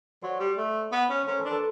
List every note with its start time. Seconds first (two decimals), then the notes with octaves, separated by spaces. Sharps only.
0.22 F#3 C5 D5
0.40 G3
0.57 A3
0.92 B3
1.10 C#4
1.23 C#4 A#4 C5 C#5
1.39 A4 B4
1.45 D4
1.51 A4 B4